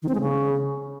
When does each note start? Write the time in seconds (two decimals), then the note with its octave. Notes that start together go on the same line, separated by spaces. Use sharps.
0.02 D#3
0.09 C4
0.15 G#3
0.21 C#3